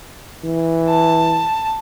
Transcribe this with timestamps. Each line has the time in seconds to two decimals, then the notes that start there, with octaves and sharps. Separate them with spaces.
0.45 E3
0.89 A5